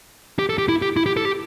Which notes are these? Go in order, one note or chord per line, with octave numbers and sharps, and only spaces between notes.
G4
A4
G4
E4
G4
E4
G4
A4
G4